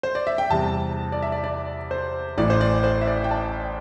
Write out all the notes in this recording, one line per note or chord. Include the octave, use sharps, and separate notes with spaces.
C5
D5
E5
G5
E2 C3 G3 A5
D5
E5
D5
D5
C5
A1 A2 E3 D5
C5
D5
C5
E5
D5
G5
A5